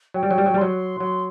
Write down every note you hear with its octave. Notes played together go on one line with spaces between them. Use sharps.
F#3 G5
G3
F#3
G3
F#3
G3
F#3 C6
F#3 C6